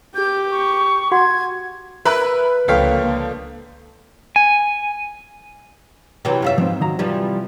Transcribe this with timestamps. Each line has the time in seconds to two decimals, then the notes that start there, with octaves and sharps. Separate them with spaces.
0.15 G4 G6
0.51 C#6
1.12 F#4 F#5 C6 G#6
2.05 A#4 B4 E5 B5 F#6
2.68 C#2 D3 F3 A#3 C#5 F5 G5 B6
4.36 G#5
6.25 C3 E3 F#3
6.42 F#2 F4 E5
6.58 G#2 F3 C4
6.81 D#3 F#3 A#5
6.99 C3 E3 F3 G3